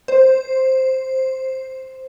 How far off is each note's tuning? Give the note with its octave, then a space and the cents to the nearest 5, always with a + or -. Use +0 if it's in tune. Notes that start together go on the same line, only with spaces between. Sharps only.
C5 +5